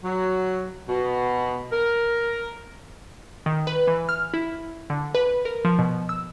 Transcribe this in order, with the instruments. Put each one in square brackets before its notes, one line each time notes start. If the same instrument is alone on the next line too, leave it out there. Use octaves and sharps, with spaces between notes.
[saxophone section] F#3
B2
A#4
[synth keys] D#3
B4
E3
F6
E4
D3
B4
A#4
F3
B2
E6